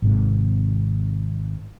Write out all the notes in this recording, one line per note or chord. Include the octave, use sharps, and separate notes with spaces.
G#1 G#2 C3